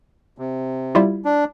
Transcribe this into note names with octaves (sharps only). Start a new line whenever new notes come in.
C3
G3 E4 F4
D4